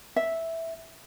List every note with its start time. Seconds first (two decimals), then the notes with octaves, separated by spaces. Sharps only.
0.16 E5